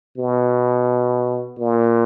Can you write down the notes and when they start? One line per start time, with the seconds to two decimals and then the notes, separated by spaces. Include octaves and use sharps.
0.18 B2
1.59 A#2